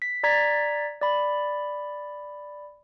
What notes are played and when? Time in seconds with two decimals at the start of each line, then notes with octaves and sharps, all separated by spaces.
0.02 B6
0.23 D5 A#5 G#6 A6 B6
1.01 D5 B5